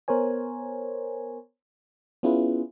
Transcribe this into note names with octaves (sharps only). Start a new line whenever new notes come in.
B3 A#4 C5 C#5 G#5
B3 C#4 E4 F4 G#4 B4